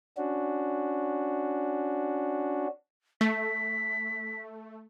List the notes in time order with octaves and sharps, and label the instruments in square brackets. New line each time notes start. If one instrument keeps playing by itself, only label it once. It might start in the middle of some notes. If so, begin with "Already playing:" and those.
[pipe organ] C#4 D4 F#4
[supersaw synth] A3 [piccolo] B6